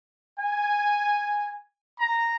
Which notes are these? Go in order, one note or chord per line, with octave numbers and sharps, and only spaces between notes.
G#5
A#5